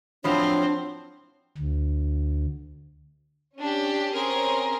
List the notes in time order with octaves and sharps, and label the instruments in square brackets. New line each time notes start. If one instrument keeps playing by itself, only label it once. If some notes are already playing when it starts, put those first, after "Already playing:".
[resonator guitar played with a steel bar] A2 F3 F#3 [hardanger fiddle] C4 [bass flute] D4 [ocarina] C#5
[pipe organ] D2
[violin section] C#4 D4 G4
C4 C#4 G#4 A#4